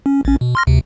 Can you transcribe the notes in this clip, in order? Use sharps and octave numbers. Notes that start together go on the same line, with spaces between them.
C#4
A1 C#4
B2
C6 F6 A#6
D2 C3